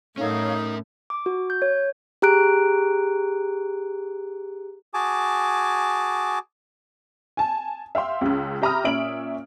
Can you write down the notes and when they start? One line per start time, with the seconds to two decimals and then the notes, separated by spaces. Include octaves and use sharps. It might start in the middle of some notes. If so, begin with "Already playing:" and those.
0.18 A2 C#4 D#4 A4 A#4 C#5 F5
1.10 D6
1.26 F#4
1.50 G6
1.62 C#5
2.22 G4 G#4 A#5 F#6 D7
4.94 F#4 G#4 G#5 A5 D6
7.37 G#5 A5
7.95 E5 F5 G5 C6
8.21 C#2 C#3
8.62 G4 E5 A#5 B5 D#6 F6
8.84 A#2 C#4 E5 D7 F#7